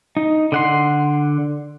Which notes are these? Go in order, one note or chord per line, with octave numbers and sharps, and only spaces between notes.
D#4
D3 F#5 C6